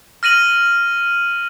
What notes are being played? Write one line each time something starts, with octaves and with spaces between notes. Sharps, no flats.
F6 A#6 D#7 F#7